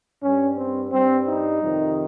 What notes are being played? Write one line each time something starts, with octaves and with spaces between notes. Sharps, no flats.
G2 G3 C#4
C4
G2 G3 C4
D#4
F2 C3 D#3